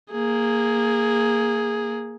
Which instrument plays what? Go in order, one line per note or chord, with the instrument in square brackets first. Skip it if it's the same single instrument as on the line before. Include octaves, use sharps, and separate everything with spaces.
[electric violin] A#3 G#4